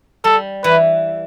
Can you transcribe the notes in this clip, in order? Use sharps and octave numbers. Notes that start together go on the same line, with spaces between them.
G3 A4
E3 B4